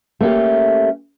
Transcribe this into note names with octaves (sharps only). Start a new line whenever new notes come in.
A3 A#3 C#4 G4